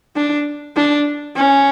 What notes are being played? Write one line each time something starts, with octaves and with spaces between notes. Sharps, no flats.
D4
D4
C#4